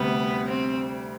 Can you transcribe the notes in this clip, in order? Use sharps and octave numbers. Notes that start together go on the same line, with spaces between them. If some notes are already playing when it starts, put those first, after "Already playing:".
Already playing: D2 C3 G3 B3
C4